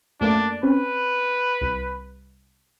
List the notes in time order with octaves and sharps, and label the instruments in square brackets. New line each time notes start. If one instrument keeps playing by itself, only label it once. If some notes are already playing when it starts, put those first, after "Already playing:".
[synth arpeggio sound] F#2 A3 A#3 [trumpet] D4
[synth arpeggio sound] C4 C#4 [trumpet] B4
[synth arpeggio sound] C2